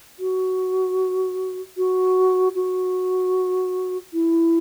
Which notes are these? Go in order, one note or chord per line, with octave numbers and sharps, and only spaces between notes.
F#4
F#4
F#4
E4